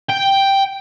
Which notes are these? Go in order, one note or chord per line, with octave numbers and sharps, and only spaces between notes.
G5